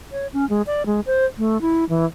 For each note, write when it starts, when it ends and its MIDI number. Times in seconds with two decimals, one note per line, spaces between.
0.12 0.27 73
0.33 0.48 61
0.50 0.62 56
0.67 0.86 74
0.86 1.01 56
1.06 1.26 72
1.38 1.60 57
1.61 1.85 64
1.89 2.05 52